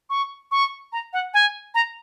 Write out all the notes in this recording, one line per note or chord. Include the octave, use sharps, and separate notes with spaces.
C#6
C#6
A#5
F#5
G#5
A#5